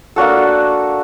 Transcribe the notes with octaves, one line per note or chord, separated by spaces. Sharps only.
A#3 D4 F#4 A4